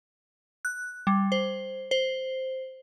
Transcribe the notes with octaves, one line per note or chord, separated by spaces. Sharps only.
F#6
G3
C5
C5